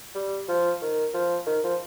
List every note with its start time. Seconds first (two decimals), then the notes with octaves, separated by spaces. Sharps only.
0.15 G3
0.48 F3
0.82 D#3
1.14 F3
1.46 D#3
1.63 F3